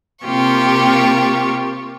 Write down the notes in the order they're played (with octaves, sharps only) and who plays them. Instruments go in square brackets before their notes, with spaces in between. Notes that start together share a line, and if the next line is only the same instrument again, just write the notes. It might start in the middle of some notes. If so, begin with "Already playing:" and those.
[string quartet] C3 A#3 F4 G4 C#6